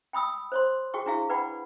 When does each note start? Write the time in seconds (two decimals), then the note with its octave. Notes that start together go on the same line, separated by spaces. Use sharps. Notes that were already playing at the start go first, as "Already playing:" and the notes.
0.13 G5 B5 D#6 E6
0.52 C5 C#5 C6
0.94 F#4 G#4 G5 C#6
1.06 D4 E4 F#4 G#4 F5
1.29 B4 D5 F#5 G5 B5